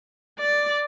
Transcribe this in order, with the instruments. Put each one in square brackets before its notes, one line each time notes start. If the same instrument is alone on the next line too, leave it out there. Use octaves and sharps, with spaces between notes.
[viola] D5